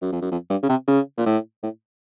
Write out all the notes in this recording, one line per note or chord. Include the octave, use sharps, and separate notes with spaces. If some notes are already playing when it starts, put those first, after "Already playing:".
F#2
F2
F#2
F2
G2
C#3
C3
C#3
A#2
A2
A2